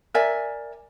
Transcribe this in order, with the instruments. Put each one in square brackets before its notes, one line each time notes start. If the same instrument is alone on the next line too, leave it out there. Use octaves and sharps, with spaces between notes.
[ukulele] A#4 D5 E5 G#5